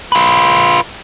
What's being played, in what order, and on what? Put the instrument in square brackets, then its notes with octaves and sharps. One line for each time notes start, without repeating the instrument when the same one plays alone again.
[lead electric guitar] F4 B4